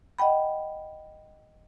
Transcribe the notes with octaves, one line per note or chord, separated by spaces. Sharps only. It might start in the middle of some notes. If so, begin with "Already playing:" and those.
D#5 F#5 G5 B5